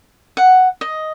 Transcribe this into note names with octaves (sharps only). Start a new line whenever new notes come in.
F#5
D#5